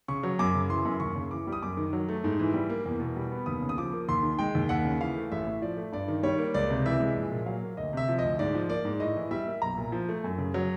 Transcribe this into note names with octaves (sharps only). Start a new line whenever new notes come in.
C#3 C#6
F#3
F#2 D6
C#3
E3 C6
F#2
D#2 C#6
C#3
E3 D6
G3
D#6
F#2 D6
D#3
F#3
A3
G#2
E3
G3
A#3
E2
B2
G3
B3
D#2 D#6
C#3
D#6
F3 D6
A#3
D#2 C6
D#3
G#3 G5
D#2
D#2 F#5
C#3
E3 F5
A3
A1 E5
A2
F3 D5
A3
G2 D5
D#3
G3 C#5
A#3
C#2 D5
C3
E3 E5
G#3
A#1
A#2
F#3 F5
A#3
D2 D#5
C3 E5
F3
D2 D#5
G#2 D5
F3
A#3 D5
G#2
A2 D#5
E3
G3 E5
A#3
B1 A#5
A#2
F3
A3
F#2
C#3
F#3